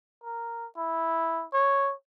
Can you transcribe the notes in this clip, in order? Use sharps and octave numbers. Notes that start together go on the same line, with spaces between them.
A#4
E4
C#5